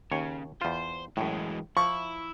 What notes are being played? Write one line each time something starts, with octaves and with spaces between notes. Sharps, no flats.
D#2 C#3 C#5
E2 F4 C5
F#2 A2 E3 G#3
F3 E4 C#6